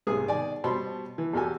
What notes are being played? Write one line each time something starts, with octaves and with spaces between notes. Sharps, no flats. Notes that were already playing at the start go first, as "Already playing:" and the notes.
B1 G#2 C3 G#4 D#6
D#3 D5 G#5
B2 G3 C4 A5 B5 C6
E3
E2 B2 F#4 G4 A4 G#5